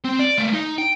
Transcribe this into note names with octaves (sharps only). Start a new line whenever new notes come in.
C4
D5
A3 A#3
D#4
G5